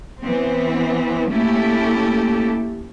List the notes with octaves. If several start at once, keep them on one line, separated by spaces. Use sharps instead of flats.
E3 B3 C4
A3 A#3 C#4 E4 G4 A4